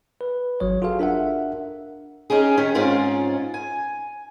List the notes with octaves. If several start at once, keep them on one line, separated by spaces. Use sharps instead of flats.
B4
G#1 F#3 C#5
F4 F#4 G#4 A4 F5
D4 A#4 E5 F#5
C#4 D#4 G4 G#4
D#3 C#4 G4
G#2 C4 C#4 F4 C5
G#5